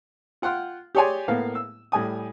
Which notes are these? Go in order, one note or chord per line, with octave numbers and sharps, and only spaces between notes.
F4 F#5 G5 C6 F6
G4 G#4 C#5 D5 G#5 C6
A2 A#3 B3 F5
E6
A2 G3 G#5 D#6